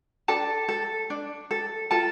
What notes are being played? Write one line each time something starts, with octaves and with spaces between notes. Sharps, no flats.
D4 A4 A5
A4
D4
A4
F4 A4 A5